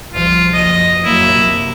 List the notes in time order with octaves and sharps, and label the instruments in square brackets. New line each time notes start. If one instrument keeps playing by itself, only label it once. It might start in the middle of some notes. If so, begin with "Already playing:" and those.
[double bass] C2 F3 [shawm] F4
[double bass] F#1 [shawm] D#5
[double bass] F#3 A#3 [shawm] E4
[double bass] C3